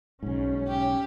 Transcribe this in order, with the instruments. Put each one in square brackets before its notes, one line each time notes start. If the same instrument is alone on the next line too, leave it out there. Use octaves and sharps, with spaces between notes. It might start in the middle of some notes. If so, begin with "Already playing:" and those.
[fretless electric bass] B1 G#2 [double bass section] C#4
[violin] G4